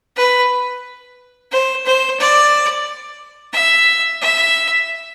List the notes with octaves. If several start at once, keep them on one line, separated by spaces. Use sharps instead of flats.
B4
C5
C5
D5
E5
E5